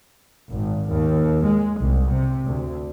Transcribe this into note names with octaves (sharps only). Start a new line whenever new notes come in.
G#1
D#2
G#3
C2
C3
D2